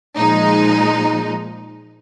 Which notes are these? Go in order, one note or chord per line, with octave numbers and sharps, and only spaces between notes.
A#2 F3 G#3 D#4